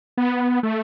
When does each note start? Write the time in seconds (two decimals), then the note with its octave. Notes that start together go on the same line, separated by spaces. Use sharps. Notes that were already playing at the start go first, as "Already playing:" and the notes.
0.17 B3
0.63 A3